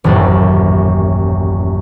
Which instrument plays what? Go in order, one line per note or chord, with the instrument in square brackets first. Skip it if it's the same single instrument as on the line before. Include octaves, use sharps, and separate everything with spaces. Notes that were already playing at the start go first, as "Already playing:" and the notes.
[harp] D#1 A1 F#2 A4 F#5